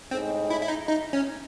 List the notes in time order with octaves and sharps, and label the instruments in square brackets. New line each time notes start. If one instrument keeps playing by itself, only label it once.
[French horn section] A2 G#3 D#4 G#4 D#5 [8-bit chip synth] C4
[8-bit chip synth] E4
E4
D#4
D#4
C#4